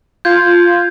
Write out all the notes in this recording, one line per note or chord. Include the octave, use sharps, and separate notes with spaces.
F4 G6 G#6